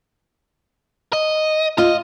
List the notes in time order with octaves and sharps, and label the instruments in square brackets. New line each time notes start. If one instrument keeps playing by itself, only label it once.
[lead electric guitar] D#5
[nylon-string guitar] F4 [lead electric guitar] D#5